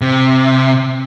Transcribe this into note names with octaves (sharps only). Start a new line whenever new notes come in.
C3